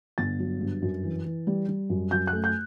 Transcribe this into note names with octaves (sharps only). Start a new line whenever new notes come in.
G1 A6
F#3
G2
F#2
E3
E3
G3
G3
F#2
F#2 G6
F#6
A3
G6